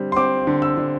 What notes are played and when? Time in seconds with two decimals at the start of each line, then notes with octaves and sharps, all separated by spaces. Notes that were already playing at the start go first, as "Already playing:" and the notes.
Already playing: D3 G3 C4
0.12 C6
0.16 C4 D6
0.47 D3
0.62 E6
0.77 D3